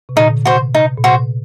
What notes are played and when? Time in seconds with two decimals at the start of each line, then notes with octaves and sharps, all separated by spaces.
0.09 C3
0.16 A#2 D3 D#4
0.31 D3
0.35 C3
0.45 F#4 C5
0.55 C3
0.75 C3 D#4
0.97 A#2
1.04 C3 F#4 C5